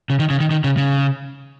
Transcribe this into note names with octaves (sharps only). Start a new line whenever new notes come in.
C#3
D#3
C#3
D#3
D#3
C#3
C#3